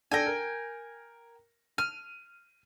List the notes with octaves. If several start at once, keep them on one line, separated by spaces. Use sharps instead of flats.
D4 A4 G5 G#5 A#6
A#4
F6 D#7